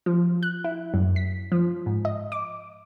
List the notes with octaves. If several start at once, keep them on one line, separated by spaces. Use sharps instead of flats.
F3
F#6
E4
F#2
B6
F3
G#2
D#5
D6